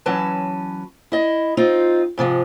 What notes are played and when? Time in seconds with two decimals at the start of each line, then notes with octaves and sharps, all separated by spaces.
0.06 E3 F#3 C#4 B4 A5
1.12 E4 D#5
1.57 C4 D#4 F4
2.18 G#2 C3 F3 G#3